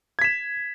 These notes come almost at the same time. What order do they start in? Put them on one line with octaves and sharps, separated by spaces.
G#6 B6 E7